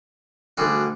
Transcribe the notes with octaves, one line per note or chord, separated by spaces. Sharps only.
D2 D3 G3 F#4 G#4